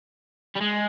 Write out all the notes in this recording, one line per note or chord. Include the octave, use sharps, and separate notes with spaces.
G3
G#3